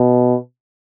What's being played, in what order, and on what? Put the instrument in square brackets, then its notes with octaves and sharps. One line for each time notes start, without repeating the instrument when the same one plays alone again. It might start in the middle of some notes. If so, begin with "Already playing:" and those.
Already playing: [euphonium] B2